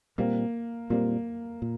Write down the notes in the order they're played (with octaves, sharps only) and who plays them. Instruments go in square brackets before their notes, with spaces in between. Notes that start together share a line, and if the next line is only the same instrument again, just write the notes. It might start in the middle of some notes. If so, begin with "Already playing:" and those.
[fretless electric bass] A#2 G3 C4 [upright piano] A#3
[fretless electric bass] A#2 G3 C4 [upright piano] A#3
[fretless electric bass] A#2